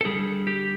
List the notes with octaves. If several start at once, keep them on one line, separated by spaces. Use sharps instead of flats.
A4
D3 G3 G#4
G4